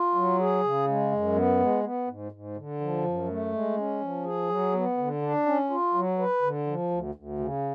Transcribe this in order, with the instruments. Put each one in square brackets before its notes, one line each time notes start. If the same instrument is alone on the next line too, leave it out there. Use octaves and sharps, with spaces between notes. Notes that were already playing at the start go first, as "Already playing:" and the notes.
Already playing: [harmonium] F4
F#3
G#4
C#3
G#3
F#2
B3
G#3
B3
G#2
G#2
D3
F3
F#2
A3
G#3
C#4
F3
G#4
F#3
B3
D3
D4
C#4
F4
F#3
B4
D3
F3
D2
D2
C#3